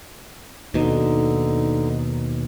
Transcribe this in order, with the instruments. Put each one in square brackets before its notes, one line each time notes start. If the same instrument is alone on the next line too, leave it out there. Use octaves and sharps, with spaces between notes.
[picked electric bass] D#2 B2 [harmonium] D3 D#4